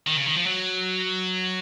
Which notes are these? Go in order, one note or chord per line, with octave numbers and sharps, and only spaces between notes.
D#3
C#3
D#3
F3
F#3